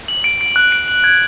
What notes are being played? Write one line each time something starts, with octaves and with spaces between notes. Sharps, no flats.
F#7
D7
D7
F#6
D7
F#7
G#6